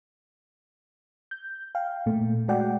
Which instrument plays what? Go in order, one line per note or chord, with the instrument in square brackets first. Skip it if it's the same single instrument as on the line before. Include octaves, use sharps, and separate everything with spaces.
[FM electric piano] G6
F5 G5
A#2 A3
G#3 A3 F#4 D5 F#5 G5